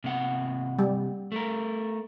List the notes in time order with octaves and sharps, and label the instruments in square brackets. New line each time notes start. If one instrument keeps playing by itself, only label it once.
[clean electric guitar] C3 A#3 F#5
[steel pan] G3
[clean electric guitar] A3 A#4